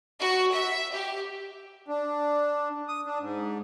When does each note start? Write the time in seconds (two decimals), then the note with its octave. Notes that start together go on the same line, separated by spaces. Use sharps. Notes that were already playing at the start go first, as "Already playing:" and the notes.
0.20 F#4
0.53 E5
0.94 G4
1.88 D4
2.88 D#6
3.06 D4
3.19 G#2